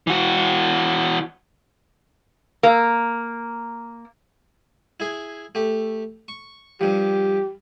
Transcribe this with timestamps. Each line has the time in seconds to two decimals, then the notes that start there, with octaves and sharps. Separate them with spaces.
0.07 E3 F#4
2.63 A#3
5.00 E4 G#4
5.55 A3 G4
6.28 C#6
6.81 G2 F3 G4